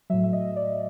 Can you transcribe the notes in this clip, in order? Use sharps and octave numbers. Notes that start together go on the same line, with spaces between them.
A2 F#3 E5
E5
D#5
D5